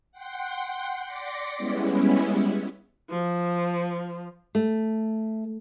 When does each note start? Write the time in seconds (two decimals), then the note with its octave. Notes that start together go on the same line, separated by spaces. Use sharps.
0.12 F#5 G5 C6 F#6
1.05 D5 C6 D6 A#6 B6 C#7
1.57 G3 G#3 B3 C#4 E4
3.10 F3
4.55 A3